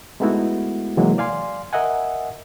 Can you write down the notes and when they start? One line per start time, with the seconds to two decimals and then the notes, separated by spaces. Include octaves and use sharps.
0.20 G#3 A3 B3 D#4 E4 F#4
0.97 C3 E3 F#3 G#3 A#3
1.18 D5 F5 G#5 C6
1.73 A#4 D#5 E5 F#5 G#5